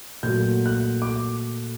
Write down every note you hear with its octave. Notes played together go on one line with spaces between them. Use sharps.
A#2 F#3 A3 G6
F#6
D6